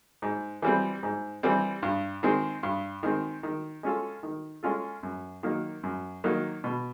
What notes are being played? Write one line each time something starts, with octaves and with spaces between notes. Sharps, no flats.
G#2
E3 G3 C4
G#2
E3 G3 C4
G2
D#3 G#3 C4
G2
D#3 G#3 C4
D#3
G#3 C#4 F4 A4
D#3
G#3 C#4 F4 A4
F#2
D#3 F#3 A#3 D#4
F#2
D#3 F#3 A#3 D#4
B2